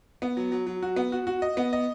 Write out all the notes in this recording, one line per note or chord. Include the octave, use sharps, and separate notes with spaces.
B3
F#3
F#3
F#3
F#4
B3
F#4
F#4
D#5
B3
D#5